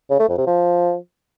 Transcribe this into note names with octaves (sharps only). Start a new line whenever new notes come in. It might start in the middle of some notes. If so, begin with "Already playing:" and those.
C#3
A3
F2
C3
F3